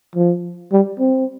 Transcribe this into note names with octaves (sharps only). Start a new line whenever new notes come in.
F3
G3
C4